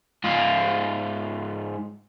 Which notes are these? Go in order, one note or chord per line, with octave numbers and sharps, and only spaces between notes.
G#2 F4